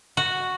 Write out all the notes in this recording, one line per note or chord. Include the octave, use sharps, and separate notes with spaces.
F#4